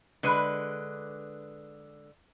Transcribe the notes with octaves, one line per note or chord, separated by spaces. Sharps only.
D3 G#3 B4